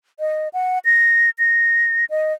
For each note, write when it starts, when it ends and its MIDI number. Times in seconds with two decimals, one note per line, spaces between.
0.20 0.48 75
0.53 0.79 78
0.85 1.30 94
1.39 2.05 94
2.10 2.33 75